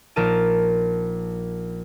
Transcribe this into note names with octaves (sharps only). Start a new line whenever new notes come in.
A#1 D#4 A#4 A5 D#7